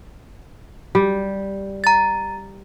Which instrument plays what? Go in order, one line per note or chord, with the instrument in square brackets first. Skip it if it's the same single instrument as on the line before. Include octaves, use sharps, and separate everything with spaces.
[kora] G3
[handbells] A#5 A6